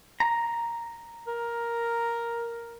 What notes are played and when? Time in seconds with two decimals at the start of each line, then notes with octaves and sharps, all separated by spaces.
0.20 A#5
1.27 A#4